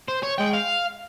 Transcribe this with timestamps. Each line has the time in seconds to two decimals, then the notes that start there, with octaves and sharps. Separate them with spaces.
0.08 C5
0.23 C#5
0.38 G#3 G5
0.53 F5